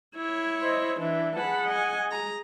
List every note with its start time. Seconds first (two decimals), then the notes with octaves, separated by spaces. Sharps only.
0.15 E4 C#5
0.61 C5 D#5
1.00 E3 D4 E5
1.36 G#4 F#5 A5 B5
1.68 D#5 G#5
2.10 G#4 A#5